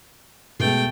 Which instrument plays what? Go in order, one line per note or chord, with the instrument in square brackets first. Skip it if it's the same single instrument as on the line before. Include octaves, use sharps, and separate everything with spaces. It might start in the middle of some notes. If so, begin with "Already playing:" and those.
[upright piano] B2 G#3 [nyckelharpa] A3 G5